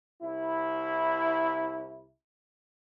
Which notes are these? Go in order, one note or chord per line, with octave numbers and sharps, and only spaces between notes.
C2 E4